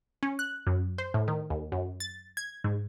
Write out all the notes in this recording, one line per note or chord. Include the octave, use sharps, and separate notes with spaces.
C#4
F#6
F#2
C5
A2
D#3
D#2
F#2
A6
G#6
G#2